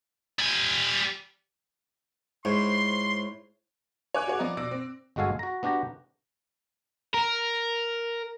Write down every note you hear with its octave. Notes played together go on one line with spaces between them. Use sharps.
G3 G#5
G#2 E4 C5 C#5 C6
C#5 G#5 D6 F#6
F#4 G#4 C#5 F#5
F3 B3 D5 D#5 A#5
B2 D5 E6 A#6 D7
C4
G1 G#3 F#4 A4 F5 G#5
F#4 A#5
B3 D4 F#4 G4 A#5
A#4